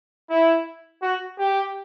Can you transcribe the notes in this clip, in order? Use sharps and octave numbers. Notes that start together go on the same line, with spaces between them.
E4
F#4
G4